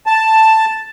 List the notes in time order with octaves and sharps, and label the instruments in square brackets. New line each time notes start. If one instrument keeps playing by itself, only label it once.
[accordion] A5